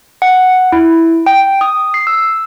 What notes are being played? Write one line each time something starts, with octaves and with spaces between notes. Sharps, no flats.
F#5
E4
G5
D#6
C7
E6